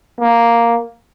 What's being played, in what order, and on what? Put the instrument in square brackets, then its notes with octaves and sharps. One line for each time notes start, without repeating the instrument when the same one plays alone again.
[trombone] A#3